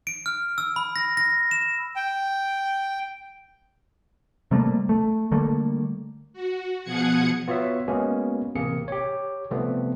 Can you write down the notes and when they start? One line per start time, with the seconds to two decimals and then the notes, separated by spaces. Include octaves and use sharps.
0.07 D7
0.26 F6
0.58 E6
0.76 B5
0.96 A#6
1.17 A#6
1.51 E7
1.96 G5
4.51 C3 G3 A3 A#3
4.89 A3
5.32 D3 G3 A3 A#3
6.33 F#4
6.84 B2 F3 G#4 F#5 G#6 C#7
7.48 B3 F4 F#4 C#5 E5
7.88 G#3 A#3 B3 C#4 F#4
8.55 A1 C3 A#3 C4 G#4 C#7
8.88 G4 C#5
9.51 C3 F3 G3 A3 B3 C4